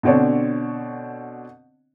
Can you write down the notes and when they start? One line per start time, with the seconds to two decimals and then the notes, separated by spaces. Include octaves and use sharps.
0.03 B2 D3 C4 D4 C#5